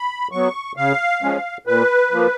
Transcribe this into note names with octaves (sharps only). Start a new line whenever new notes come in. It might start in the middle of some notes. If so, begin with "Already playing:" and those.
Already playing: B5
F#3 B3 C#6
C#3 F5
F3 G#3 C#4
A#2 B4
F3 A#3